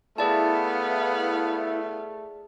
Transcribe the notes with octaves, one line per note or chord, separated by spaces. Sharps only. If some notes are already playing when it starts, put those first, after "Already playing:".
A3 B3 E4 G#4 D5 F5 A5